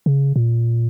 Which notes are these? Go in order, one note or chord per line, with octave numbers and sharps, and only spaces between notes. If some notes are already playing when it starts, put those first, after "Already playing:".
C#3
A#2